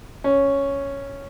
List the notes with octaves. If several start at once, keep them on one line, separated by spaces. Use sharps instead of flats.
C#4